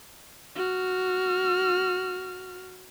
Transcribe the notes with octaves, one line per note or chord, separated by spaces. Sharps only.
F#4 F6